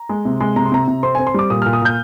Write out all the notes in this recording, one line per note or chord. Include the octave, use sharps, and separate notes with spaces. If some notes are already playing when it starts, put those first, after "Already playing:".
Already playing: A#5
G#3
C3
G#3
C3 A#5
C6
C3 A#5
C3
C4 C6
C4 G#5
C6
G3 D6
A#2 D#6
A#2 F6
D#6
A#2 G6